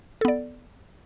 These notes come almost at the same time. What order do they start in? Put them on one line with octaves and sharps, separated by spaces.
A4 B3 D5